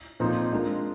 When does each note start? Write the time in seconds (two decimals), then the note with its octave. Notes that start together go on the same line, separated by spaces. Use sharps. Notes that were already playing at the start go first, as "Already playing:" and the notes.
0.20 A#2 F3 C4 D#4
0.53 G#3 D4 F4 A#4